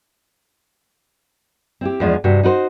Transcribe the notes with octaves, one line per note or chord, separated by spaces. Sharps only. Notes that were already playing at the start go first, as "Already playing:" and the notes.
C4 E4 G4
E2 F3 G#3 D4
G2 C3 F#4
D#4 F#4 B4 C5